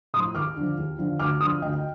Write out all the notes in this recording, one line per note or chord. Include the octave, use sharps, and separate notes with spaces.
A2 F3 C6 D#6
D#2 D6 F6
D3 F3
D#2
D3 F3
D2 D6 F6
D3 F3 C6 D#6
D2 D#5 G5
G5